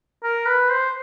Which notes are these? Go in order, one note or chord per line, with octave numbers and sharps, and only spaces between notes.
A#4
B4
C5